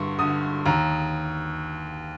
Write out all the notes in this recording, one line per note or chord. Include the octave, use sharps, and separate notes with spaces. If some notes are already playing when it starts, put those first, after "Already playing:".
Already playing: G2 D3 C6 C#6
D3 D#6
D#2 A#5